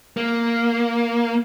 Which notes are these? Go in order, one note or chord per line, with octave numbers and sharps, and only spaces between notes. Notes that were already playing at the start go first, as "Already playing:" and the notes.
A#3